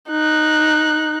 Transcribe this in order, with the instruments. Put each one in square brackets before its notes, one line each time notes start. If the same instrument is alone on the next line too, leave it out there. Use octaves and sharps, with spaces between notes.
[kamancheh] D#4 F#6